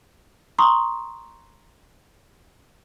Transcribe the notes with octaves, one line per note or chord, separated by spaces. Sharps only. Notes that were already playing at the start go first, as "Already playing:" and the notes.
A#5 C6 C#6 D#6